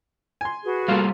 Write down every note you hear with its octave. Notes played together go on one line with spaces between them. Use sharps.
G#5 C6
F#4 G#4 B4
G3 A3 A#3 F4 C5 F5